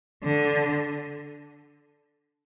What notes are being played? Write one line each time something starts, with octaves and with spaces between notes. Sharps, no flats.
D3